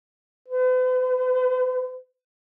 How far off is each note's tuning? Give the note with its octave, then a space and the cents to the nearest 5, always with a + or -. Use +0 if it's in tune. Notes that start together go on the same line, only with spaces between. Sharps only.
B4 +45